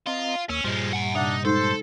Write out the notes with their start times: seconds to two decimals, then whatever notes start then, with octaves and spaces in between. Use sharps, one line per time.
0.07 C4 F4 D#5 A#5
0.49 D#2 A#3 C#4 E6
0.64 G2 A#2 F3 G3 G#3
0.93 F#5 G#5
1.15 C3 D4 D#4 E5 F#5
1.45 G#3 D#4 A4 C5